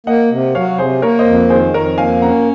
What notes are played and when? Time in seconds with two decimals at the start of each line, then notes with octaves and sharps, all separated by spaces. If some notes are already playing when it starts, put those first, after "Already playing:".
0.06 A#3 D#5 F#5
0.31 C3
0.55 F#3 C#5 F5
0.78 C3 G#4 C5
1.02 A#3 A#4 C#5
1.19 C5 D#5
1.26 F2
1.50 D#3 G#4 C5
1.74 F2 A#4 C#5
1.98 A#3 F5 G#5
2.21 C#4 F#5 A#5